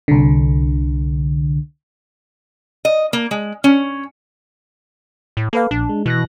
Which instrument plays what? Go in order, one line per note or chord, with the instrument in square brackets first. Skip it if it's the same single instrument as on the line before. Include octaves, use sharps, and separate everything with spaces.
[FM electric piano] C2 D3
[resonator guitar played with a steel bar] D#5
A#3
G#3
C#4
[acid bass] A2
[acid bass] A#3 [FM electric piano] A4 B4 F5
[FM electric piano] A#1 [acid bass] D4
[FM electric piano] G#3
[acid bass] B2 [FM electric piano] E3 F#6 A#6